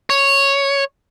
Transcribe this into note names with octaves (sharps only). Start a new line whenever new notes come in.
C#5